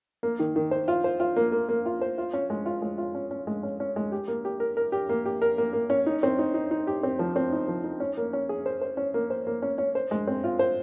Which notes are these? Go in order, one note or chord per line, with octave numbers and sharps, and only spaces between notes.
A#3
D#3
D#3
C5
F4
C5
F4
A#3
A#3
A#3
F4
C5
F4
C#4
G#3
F4
G#3
F4
C#4
C#4
G#3
C#4
C#4
G#3
G4
A#3
G4
A#4
A#4
G4
A#3
G4
A#4
A#3
A#3
C#4
D#4
C4
D#4
D#4
D#4
G4
C4
F3
C4
D#4
F3
D#4
C#4
A#3
C#4
G#4
C5
C5
C#4
A#3
C5
A#3
C#4
C#4
C5
G#3
C4
F4
C5